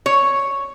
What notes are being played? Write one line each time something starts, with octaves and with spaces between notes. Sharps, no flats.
C#5